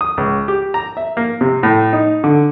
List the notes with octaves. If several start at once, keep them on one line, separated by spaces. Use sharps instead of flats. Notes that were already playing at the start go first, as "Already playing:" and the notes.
D#6
C#2
G4
A#5
E5
A#3
C3
A2
D#4
D3